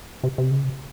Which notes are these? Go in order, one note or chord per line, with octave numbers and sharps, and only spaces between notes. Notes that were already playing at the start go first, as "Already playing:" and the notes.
C3
C3
C#3
C3